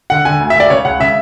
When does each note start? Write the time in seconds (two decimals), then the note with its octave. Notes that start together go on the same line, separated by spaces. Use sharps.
0.10 D3 F#5
0.25 D3 G#5
0.40 D2
0.50 E5
0.56 D2 D5
0.70 C#3 C#5
0.85 C#2 F#5
1.00 C#3 E5